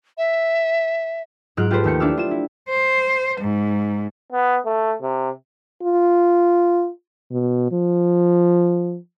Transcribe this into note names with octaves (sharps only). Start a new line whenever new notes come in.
E5
G#2 F#3 F4 F6 F#6 D7
F4 G4 A4 B4 C5
D#2 A3 G5 C#7
D4 E4 D6 E6 F6
F4 E7
E4
C5
G#2
B3
A3
C3
F4
B2
F3